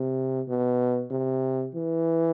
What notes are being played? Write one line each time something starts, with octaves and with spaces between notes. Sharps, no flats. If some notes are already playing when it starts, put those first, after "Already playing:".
Already playing: C3
B2
C3
E3